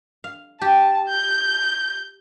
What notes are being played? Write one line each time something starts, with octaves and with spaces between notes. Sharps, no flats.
F5
G4 A5
G6